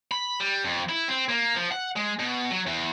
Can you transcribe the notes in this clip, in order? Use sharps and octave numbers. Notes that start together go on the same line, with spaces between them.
B5
G3
F2
E4
C4
A#3
F3
F#5
G#3
B2
F#3
E2